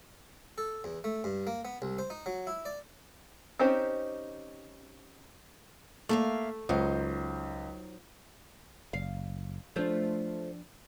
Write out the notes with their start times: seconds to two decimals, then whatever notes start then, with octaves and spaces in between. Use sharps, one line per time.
0.58 A4
0.84 E2
1.04 A3
1.24 G2
1.47 A#3
1.65 B3
1.82 C2
1.98 C5
2.10 D#4
2.26 F#3
2.47 E4
2.65 D5
3.59 C4 C#4 D#4 G4 C5
6.09 A3 A#3 E5 F5
6.69 C#2 F#3 D#4 C5
8.93 F#1 F5
9.76 F3 A3 D4 F4 C5